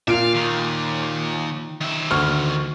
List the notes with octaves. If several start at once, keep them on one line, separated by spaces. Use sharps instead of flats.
A#2 E5 F5 D7
D#2 D#3
D#3 E5
D2 C#6 F6